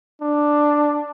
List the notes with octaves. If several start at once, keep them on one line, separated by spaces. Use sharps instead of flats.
D4